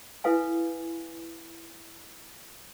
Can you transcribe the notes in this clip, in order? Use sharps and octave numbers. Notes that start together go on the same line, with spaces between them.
E4 A4 B4 F5 G#5